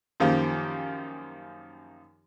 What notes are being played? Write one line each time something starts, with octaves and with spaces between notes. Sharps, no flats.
F#2 D#3 F3 A#3 G4